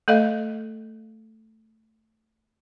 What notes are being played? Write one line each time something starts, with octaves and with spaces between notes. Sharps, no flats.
A3 A4 D#5 F5